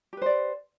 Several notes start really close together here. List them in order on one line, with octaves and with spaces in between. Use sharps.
G4 B4 C5 D5